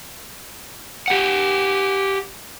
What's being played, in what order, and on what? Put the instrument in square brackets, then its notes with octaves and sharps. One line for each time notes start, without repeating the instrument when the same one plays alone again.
[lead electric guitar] G4 F#5